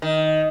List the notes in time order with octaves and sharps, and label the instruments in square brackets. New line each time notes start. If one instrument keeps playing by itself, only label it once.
[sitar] D#3